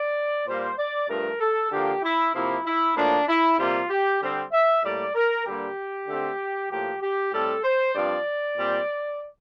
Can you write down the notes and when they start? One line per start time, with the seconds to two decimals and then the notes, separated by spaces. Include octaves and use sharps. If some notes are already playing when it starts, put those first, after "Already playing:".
Already playing: D5
0.47 A#2 G3 A#3 C5
0.78 D5
1.09 G2 F3 A3 A#4
1.40 A4
1.71 D3 F3 A#3 G4
2.03 E4
2.35 C3 F3 A#3 E4
2.66 E4
2.96 A2 F3 A#3 D4
3.28 E4
3.58 C3 G3 A#3 F4
3.90 G4
4.22 D3 G3 C4
4.52 E5
4.83 A2 G3 A#3 D5
5.15 A#4
5.46 G2 D3 G3 A#3 G4
6.08 D3 A3 C4
6.70 A2 F3 A#3 G4
7.02 G4
7.32 A2 G3 C4 A4
7.64 C5
7.95 G2 F3 C4 D5
8.58 A#2 G3 C4